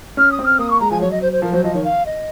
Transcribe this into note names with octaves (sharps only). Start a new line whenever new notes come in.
C#4 F6
D#6
C4
F6
A#3 D#6
C#6
G#3 A#5
F3 G#5
F#3 C#5
D#5
C5
C5
F3 A#4
F#3 C5
F3 D#5
D#3 C#5
F5
D#5